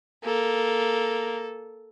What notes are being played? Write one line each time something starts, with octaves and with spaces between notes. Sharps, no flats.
A#3 A4